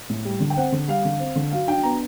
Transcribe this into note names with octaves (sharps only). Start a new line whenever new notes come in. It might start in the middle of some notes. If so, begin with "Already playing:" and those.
A2
G3
D3
G5
C4 F#5
D3
G3 F5
D3
C4
D3
F#3 F5
D4 G5
B3 A#5